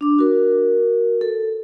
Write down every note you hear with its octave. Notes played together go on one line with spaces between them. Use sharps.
D4 D6
F#4 A#4
A4